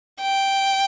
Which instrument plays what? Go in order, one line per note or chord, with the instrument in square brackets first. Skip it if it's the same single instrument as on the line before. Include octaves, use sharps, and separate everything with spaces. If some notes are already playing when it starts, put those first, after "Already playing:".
[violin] G5